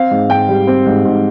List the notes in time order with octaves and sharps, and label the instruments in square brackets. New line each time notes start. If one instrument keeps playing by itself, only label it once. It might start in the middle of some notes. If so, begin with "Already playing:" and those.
Already playing: [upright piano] C4 F5
G#2
G#2 G5
G3
C4
G#2
G#2